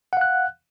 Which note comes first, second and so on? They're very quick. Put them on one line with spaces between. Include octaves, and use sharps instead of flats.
F#5 F5 F#6